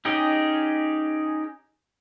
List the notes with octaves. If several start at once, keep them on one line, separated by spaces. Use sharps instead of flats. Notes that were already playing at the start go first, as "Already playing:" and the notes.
C#4 D#4 G4 G#4 D#5